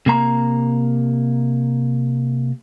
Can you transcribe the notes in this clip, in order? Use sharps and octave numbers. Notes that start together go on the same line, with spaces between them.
C3 A#3 A#5